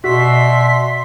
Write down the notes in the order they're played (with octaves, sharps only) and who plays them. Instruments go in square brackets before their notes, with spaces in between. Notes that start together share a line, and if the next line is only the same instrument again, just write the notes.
[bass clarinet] B2 [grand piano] F#4 [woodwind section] D5 E5 C6 [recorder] B6